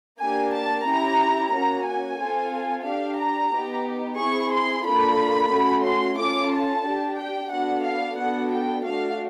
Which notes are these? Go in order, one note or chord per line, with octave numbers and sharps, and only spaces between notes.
A#3 D4 G4 G#5
A5
C#4 E4 G4 A#5
A#3 C#4 F#4 A#5
G#5
C4 F4 A4
D4 G4 F5
A#5
B3 D#4 G4
C4 E4 G#4 C#6
C6
A#3 D4 F4 A4 B5
A3 C#4 F#4
C6
C#4 F4 A4 D6
A5
D4 G4
G5
B3 D4 F#4 A4 F#5
F5
B3 D4 F#4 A4 F#5
G5
A3 D4 F#4 F5